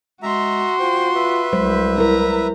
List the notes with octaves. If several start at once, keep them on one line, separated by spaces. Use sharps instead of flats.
G#3 F#4 E5 A#5 C6
F4 C5 G5
B4 E5
C2 F#3 G#3 C5
E4 A#4 A#5